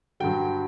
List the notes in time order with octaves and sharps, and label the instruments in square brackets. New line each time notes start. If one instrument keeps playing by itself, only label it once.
[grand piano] G2 D3 F#3 G5